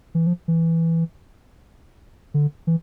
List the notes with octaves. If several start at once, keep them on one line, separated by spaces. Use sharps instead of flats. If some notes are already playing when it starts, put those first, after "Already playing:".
E3
F3
E3
D3
E3